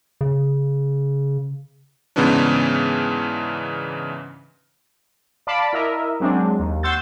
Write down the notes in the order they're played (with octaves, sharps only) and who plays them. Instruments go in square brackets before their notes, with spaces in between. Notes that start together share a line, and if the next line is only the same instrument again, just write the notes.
[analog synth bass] C#3
[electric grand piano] G#2 C#3 E3 B3 C#4 D4
[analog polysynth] D5 F5 A5 B5 D6
E4 A#4 D#5 E5
F#3 G#3 C4 D4
D#2
F#5 C6 C#6 E6 G6 A6